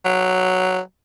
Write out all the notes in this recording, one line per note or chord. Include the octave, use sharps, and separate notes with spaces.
F#3